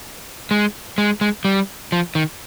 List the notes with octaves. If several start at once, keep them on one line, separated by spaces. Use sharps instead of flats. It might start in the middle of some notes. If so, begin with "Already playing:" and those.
G#3
G#3
G#3
G3
F3
D#3